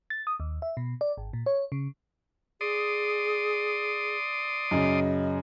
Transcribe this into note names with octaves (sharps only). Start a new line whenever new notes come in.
A6
D#6
D#2
E5
B2
D5
G#1
A#2
C#5
C#3
G#4 D5 C6 D#6
F#2 C#3 D#5